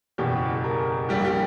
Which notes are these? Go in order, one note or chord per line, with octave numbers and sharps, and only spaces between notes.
F#1 E2 B2 G4
A#4
A#1 A#2 G3 G4
G4